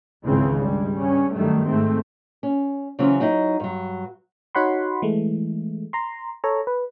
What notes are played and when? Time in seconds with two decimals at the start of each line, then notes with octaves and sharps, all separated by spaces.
0.25 G#1 C#2 G#2 C#3 E3 C4
0.59 G2 G3 G#3
0.96 G2 C#3 C#4
1.34 F#2 D#3 F#3 G3 A3
1.67 G#2 G#3 A3 C4
2.43 C#4
2.99 C#3 E3 F#3 C4 C#4 E4
3.20 F#3 D#4 E4 D#5
3.60 G2 F#3
4.55 D#4 F#4 C#5 F#5 B5 C6
5.02 E3 G#3 A3
5.93 A#5 C6
6.44 A4 C#5 A#5
6.67 B4